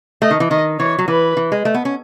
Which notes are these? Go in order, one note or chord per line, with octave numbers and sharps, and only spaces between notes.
A3 D#5
D#3
E3
D#3 D#5
E3 C#5
F#3
E3 B4
E3
G#3
A3
B3
C#4